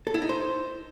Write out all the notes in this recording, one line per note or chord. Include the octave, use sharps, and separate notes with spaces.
A4
E4
D#4
C5